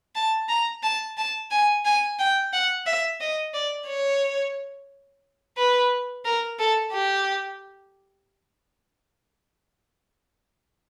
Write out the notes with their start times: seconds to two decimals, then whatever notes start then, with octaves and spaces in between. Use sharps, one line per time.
0.15 A5
0.49 A#5
0.83 A5
1.17 A5
1.51 G#5
1.85 G#5
2.19 G5
2.53 F#5
2.86 E5
3.21 D#5
3.54 D5
3.88 C#5
5.57 B4
6.25 A#4
6.59 A4
6.93 G4